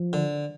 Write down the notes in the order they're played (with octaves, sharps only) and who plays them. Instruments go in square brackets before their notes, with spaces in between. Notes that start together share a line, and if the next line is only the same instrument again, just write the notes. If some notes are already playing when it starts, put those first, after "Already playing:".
Already playing: [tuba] F3
[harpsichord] D3